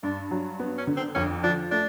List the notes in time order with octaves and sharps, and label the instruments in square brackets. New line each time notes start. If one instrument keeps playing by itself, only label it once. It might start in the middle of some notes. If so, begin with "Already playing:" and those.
[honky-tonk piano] G2 [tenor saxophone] D4
[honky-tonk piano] F#3
B3
[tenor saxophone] C#4
[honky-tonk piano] D3
[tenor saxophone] C4
[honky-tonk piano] F2 [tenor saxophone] C#4
[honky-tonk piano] F3 [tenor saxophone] D4
[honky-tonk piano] A3 [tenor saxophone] D4